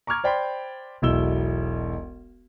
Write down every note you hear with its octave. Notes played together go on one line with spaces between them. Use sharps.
A#5 C#6 D6 F6 G#6
C5 D5 G5 B5 C6
E1 B1 E4 E6 G7